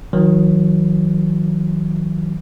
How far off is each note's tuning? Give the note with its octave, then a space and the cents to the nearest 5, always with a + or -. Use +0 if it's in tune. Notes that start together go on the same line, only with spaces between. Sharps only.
D#3 +35 F#3 -20